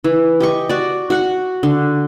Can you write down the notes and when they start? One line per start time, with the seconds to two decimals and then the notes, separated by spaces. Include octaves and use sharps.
0.04 E3
0.40 G4 D#5 C#6
0.69 F#4 D5
1.10 F#4 F#5 C#6
1.63 D3